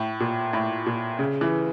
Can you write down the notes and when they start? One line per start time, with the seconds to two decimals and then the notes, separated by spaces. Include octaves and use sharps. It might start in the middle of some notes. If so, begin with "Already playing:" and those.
Already playing: A2
0.20 A#2
0.53 A2
0.86 A#2
1.19 C#3
1.41 E3